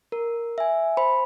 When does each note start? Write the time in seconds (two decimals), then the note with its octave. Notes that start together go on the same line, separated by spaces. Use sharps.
0.12 A#4
0.58 E5 G#5
0.97 C5 B5